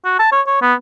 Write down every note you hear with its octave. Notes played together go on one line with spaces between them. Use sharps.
F#4
A5
C#5
C#5
B3